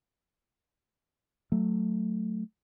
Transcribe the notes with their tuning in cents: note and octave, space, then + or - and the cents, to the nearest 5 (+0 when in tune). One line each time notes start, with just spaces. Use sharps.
F#3 +0 A3 +0